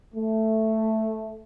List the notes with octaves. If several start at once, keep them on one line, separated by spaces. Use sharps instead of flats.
A3